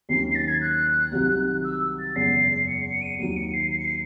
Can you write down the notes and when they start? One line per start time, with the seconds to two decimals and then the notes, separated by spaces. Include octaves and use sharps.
0.09 D#2 D#3 F#3 C#4 C7
0.31 C7
0.35 A6
0.48 G#6
0.60 F#6
1.12 C2 C3 D#3 F#3
1.64 E6
1.99 A6
2.15 F#1 E2 C#3 G#3 C7
2.67 C#7
2.85 C#7
3.01 D#7
3.19 D#2 D#3 F#3 D#7
3.36 C#7
3.53 C7
3.70 C7
3.78 C#7
3.84 C7